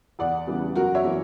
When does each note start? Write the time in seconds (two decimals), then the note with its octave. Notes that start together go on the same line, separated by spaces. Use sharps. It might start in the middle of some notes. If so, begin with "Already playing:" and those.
0.19 E2 D5 F#5
0.47 C#3 E3 G3 B3
0.75 F#2 F#4 A#4
0.95 C#5 E5
1.04 E3 A#3